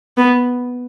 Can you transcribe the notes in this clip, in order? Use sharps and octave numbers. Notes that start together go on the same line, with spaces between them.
B3